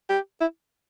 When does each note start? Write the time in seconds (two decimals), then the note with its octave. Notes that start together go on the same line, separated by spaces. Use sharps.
0.09 G4
0.41 E4